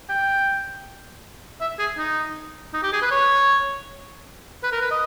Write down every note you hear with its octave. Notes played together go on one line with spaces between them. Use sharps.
G5
E5
G#4
D#4
D#4
G4
G#4
B4
C#5
B4
A#4
B4
D#5